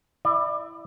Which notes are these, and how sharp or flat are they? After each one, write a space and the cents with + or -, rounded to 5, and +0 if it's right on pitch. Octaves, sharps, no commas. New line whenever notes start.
E4 +0 D5 +25